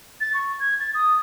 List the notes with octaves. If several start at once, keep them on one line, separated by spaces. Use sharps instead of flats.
A6
C#6
G#6
A6
D#6